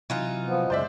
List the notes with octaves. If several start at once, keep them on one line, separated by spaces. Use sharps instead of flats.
C3 E3 F#3 D#4 F4
F3 B3
F#2 C#3 G#3 C5 D5 E5